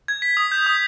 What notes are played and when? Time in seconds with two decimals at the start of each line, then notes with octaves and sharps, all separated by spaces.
0.08 G#6
0.22 B6
0.37 D#6
0.52 G6
0.66 D#6